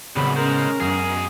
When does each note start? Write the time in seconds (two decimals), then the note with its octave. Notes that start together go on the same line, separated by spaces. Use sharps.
0.16 C2 F#2 A2 C#3 B3 B5
0.36 G#3 C#4 A#4 C5
0.80 F#2 B2 G#4